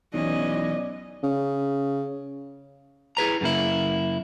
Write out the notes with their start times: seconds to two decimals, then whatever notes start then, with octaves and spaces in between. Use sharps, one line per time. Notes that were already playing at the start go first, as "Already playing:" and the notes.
0.14 B1 E3 C#4 D5 D#5
1.23 C#3
3.17 E4 G#4 B4 A#5
3.41 F#2 C#3 A#3 E4